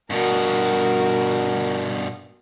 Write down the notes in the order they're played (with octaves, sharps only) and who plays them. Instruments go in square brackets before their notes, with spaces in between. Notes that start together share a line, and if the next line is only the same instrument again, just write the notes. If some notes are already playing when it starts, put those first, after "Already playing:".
[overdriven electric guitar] G2 B2 [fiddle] F#4 A#4